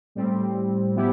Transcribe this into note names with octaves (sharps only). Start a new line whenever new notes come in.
A2 G3 C4
F3 B3 E4 G4